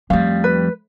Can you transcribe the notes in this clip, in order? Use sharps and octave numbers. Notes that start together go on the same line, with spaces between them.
F2 F3 G3 A3 F5
B4